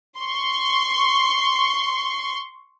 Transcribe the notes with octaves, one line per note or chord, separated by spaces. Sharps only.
C6 C#6